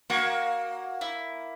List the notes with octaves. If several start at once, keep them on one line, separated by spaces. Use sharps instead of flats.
A#3 F#4
E4